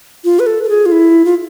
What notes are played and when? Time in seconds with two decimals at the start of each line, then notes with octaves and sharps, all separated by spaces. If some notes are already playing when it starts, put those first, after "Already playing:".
0.25 F4
0.39 B4
0.46 A4
0.64 A4
0.69 G#4
0.86 F4
0.92 E4
1.25 F4